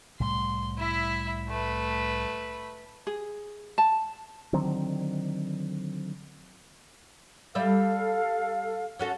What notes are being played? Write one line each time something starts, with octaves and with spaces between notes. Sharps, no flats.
C2 A2 G3 C6
E4 E5
A3 B4
G#4
A5
D3 D#3 F#3 C4
G3 A4 D5 E5 F5
C#4 F#4 A4